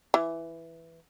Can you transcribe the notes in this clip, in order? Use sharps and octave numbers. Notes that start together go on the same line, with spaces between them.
E3